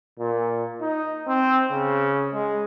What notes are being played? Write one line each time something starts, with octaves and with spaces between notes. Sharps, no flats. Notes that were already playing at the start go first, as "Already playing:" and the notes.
A#2
D#4
C4
C#3
G#3